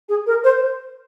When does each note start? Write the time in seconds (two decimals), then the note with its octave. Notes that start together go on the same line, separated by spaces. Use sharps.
0.09 G#4
0.26 A#4
0.44 C5